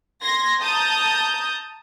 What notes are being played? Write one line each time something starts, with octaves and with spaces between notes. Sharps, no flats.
C6 G#6 A#6
A5 A#5 D#6 G6